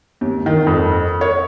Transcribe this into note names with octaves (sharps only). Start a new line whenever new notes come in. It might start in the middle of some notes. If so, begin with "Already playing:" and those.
D#2
D#3
F2
C#5